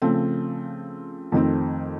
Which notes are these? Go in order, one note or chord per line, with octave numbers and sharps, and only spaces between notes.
C#3 F3 A3 C4
F2 D#3 A3 C4